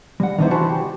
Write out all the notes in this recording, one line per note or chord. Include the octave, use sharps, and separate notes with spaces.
G3 F#5
D#3 B3 D4 E4 C5
C2 E3 F#4 C5 A5 B5
G4